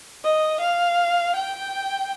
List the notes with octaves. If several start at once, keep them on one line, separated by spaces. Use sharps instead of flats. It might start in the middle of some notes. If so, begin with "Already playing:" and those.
D#5
F5
G5